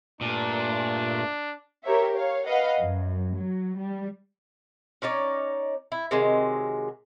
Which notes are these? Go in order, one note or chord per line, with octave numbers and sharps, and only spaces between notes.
G2 A#2 A3 D4
G4 A#4 C#5 E5
C#5 F5
B4 D#5 F5 F#5
F#2
F#3
G3
C#4 D#4 C#5 D5
E4
C3 D#3 F#3 G#3